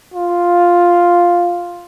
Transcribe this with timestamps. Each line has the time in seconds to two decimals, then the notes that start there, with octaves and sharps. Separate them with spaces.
0.14 F4